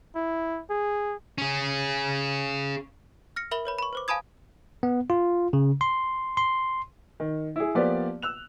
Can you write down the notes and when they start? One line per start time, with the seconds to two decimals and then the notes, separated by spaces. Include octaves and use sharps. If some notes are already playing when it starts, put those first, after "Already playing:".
0.15 E4
0.70 G#4
1.38 C#4 G#4
3.36 F6 A#6 C#7
3.51 A#4 E5 B5 F#7 G7
3.65 B4 C#5 B5
3.78 B5 C#6
3.93 B4 C5 D6
4.08 F5 G#5 A5 B5 D#6 G#6
4.83 B3
5.10 F4
5.53 C#3
5.81 C6
6.37 C6
7.20 D#3
7.56 E4 G#4
7.75 F3 A#3 B3 G4 C5 D5
8.22 E6 F#6 F7